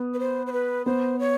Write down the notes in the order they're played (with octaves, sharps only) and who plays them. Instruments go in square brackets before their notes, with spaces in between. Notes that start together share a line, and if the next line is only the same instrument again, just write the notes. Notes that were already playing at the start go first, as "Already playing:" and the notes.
Already playing: [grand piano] B3
[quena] B4
C5
C5
B4
[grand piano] B3 [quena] C5
[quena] C#5